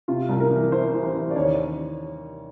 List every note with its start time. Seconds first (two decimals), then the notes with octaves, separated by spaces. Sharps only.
0.08 C3 F4
0.29 C2
0.40 A#4
0.50 E3
0.72 E3 C5
0.93 E3
1.03 C5
1.14 E3
1.30 D5
1.36 D#2 C#5